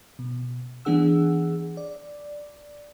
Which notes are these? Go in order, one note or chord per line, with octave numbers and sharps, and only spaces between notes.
B2
E3 B3 D4 G#4 F#5 E6
D5